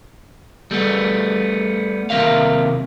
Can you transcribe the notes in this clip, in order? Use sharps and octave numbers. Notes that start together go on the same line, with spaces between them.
G3 A3 B3
D#2 C3 A3 A#4 E5 F5